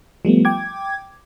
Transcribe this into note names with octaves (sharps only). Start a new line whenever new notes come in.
F3 G3 A3 B3
G5 D6 G#6